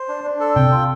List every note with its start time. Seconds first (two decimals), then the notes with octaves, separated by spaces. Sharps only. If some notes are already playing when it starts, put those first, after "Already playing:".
Already playing: C5
0.08 D4
0.24 D4
0.40 A4
0.55 C3 G5
0.72 F4